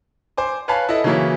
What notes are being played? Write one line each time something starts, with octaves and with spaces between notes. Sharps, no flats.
C5 G#5 D6
B4 C#5 F5 G#5 A5 B5
E4 A4 D#5
C#3 E3 F#3 A#3 E4 C#5